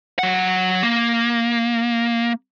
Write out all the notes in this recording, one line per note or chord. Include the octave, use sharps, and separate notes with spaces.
F#3 F#5
A#3